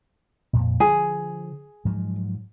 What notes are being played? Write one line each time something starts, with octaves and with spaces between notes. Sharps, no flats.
F2 A#2
D3 F3 G#4
G#2 F3 F#3